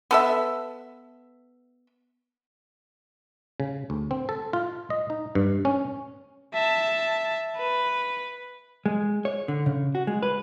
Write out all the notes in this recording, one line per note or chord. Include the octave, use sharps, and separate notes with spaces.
B3 A4 E5
C#3
D2
C4
A4
F4
D#5
D#4
G2
C#4
E5 A5
B4
G#3
C#5
D3
C#3
F#4
G#3
B4